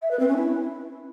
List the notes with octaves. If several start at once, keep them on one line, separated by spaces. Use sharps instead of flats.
E5
B4
C4
C#4
E4